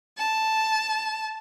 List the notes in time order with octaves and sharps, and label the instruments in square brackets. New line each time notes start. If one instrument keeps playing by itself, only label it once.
[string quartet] A5